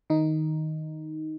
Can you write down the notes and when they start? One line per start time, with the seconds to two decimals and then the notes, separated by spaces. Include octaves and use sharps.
0.10 D#3 D#4